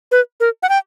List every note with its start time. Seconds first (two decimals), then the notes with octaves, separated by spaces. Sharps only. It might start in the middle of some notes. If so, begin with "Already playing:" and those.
0.12 B4
0.40 A#4
0.63 F#5
0.69 G5